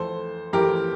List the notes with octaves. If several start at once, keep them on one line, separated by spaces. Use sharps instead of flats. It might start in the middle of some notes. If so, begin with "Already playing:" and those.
Already playing: F2 E3 A3 A4 C5
F2 E3 A3 G4 A#4